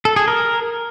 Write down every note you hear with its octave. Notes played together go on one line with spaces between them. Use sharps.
A4
G#4
A#4